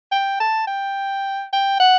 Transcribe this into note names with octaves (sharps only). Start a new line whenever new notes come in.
G5
A5
G5
G5
F#5